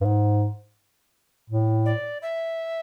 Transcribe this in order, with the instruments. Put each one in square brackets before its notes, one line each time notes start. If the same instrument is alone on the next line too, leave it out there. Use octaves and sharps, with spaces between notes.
[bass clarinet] G2
G#2
A2
[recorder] D5
E5